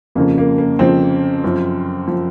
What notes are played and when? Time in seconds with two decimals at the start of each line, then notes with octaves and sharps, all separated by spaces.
0.15 F2 C#3 F3 A#3
0.38 A#3
0.58 A#3
0.79 F2 C#3 F3 C4
1.44 F#2 F3
2.07 F3